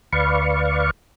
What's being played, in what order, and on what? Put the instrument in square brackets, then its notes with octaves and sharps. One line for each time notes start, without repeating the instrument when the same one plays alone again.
[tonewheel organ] D2 B4 D5 F5 C#6